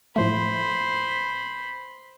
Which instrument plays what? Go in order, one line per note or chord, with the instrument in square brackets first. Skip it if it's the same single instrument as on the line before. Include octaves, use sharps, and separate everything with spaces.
[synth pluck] A2 F3 A3 [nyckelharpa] C5 B5